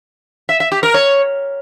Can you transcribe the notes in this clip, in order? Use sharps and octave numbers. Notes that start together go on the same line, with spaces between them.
E5
E5
G4
A#4
C#5